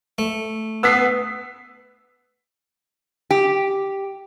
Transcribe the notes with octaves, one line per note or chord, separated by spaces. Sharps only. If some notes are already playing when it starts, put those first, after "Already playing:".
A3
B3 E6 B6 C7
G4